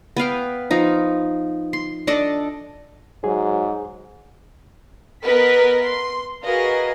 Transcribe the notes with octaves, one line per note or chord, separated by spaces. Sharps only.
B3 B4 F5 G5
F3 D#4
C6
D4 A4 D5 D#5
G#2 F#3 G#4
B3 A#4 B4 D#5 B6
C6
F#4 G#4 A#4 B4 D#5 F5